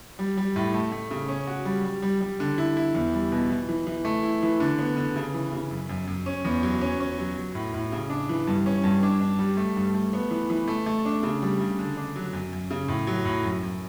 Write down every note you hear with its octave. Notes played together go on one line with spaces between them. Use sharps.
G3
G3
A2
A3
A3
C#3
C#4
F#4
G3
G3
G3
G3
D3
E4
E4
E2
G3
B2
E3
E3
E3
A3
E4
E3
D3
B3
D3
C#3
E3
C#3
F#2
F#2
F#2
C#4
E2
F#3
C#4
C#4
F#3
F#3
A2
A2
C#3
D4
E3
G2
C#4
G2
D4
D4
G3
A3
G2
A3
B3
E3
E3
A3
A3
D4
C#3
G3
C#3
D3
D4
F#3
F#2
F#2
C#3
A2
F#3
A2
F#2
F#2